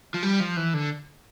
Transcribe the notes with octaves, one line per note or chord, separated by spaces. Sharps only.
F3
G3
F3
E3
D3